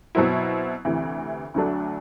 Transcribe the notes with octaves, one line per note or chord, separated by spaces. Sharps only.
B2 F#3 C4 E4
D2 C3 E3
D2 D3 F#3 A3 D4